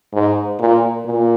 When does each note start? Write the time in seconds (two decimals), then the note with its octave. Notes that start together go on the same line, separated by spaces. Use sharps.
0.13 G#2
0.59 A#2
1.06 A#2